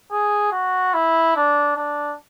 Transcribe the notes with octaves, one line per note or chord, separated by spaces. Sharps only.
G#4
F#4
E4
D4
D4